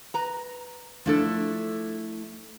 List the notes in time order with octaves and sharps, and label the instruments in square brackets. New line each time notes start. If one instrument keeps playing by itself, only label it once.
[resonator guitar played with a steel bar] B4 A#5
[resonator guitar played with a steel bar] F3 D4 A4 [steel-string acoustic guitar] A3 E4